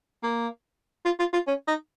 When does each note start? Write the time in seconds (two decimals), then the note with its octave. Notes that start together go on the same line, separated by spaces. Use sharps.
0.23 A#3
1.05 F4
1.19 F4
1.33 F4
1.47 C#4
1.68 D#4